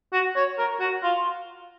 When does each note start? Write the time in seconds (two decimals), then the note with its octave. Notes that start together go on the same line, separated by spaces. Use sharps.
0.13 F#4
0.36 C#5
0.58 A#4
0.80 F#4
1.03 F4